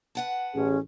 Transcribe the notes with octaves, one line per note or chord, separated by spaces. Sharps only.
B4 F#5 A5
A1 C#4 G#4